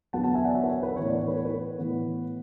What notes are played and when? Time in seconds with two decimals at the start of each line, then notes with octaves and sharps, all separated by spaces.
0.13 E2 D3 F#3 B3 F#5 A5
0.24 F#5 A5
0.34 E5 G#5
0.44 D5 F#5
0.55 C#5 E5
0.63 B4
0.69 C#5
0.83 B4
0.96 A2 E3 B3 C#5
1.07 B4 D5
1.17 C#5
1.27 B4
1.36 C#5
1.45 B4
1.78 A2 E3 B3